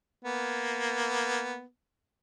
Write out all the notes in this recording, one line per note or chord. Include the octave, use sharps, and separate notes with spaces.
A#3 B3